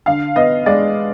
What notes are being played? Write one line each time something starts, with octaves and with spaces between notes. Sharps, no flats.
D3 F5
B3 D#5
G#3 D5